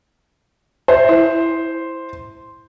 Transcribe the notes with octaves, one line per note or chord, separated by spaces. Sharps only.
C5 E5
E4